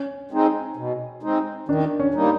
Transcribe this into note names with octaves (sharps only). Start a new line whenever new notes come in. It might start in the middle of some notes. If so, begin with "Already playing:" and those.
Already playing: C#4
G#3 C4 D#4
B2
G#3 C4 D#4
D#3 D4
C#4
G3 A#3 D#4